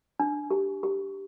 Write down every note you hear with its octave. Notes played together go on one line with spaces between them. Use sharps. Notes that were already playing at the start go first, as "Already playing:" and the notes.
D4
G4
G4